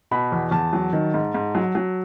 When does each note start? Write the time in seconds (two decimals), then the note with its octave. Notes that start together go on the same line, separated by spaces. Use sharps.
0.11 B2 B5
0.32 E2
0.51 E2 A5
0.73 F#3
0.93 D#3
1.14 G#2
1.34 G#2
1.55 F#3
1.75 F#3